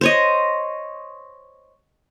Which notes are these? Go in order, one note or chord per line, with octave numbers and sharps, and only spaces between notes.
C5 C#5 D#5